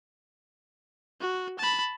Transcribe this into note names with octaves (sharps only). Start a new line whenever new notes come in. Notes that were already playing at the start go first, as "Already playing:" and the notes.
F#4
A5 B5